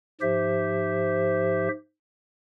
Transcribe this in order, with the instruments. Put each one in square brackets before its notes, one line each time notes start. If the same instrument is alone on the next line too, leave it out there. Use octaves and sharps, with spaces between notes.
[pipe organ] G#2 F3 G4 C5 E5